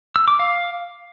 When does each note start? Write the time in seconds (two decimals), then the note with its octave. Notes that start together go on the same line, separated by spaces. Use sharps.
0.16 E6
0.28 D6
0.39 F5